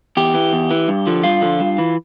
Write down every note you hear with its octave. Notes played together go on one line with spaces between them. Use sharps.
E2 G4
E3
E2
E3
G2
D3 F3
G2 F4
D3 F3
G2
E3